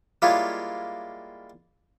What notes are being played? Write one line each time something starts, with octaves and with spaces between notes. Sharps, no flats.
G3 G#3 A#3 E4 F4 C#5